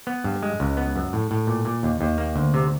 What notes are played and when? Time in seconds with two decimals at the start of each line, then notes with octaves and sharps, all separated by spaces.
0.07 B3
0.24 G2
0.43 G#3
0.60 C#2
0.77 B3
0.96 F#2
1.13 A2
1.31 A2
1.47 A#2
1.65 A#2
1.83 D#2
2.01 D#2
2.18 A#3
2.36 D2
2.54 C3